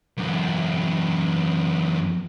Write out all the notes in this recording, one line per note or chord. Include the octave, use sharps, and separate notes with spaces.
F#2 E3